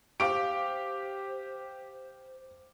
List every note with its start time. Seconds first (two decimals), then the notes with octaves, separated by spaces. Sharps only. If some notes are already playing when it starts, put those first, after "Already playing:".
0.20 G4 C5 F5 D6 D7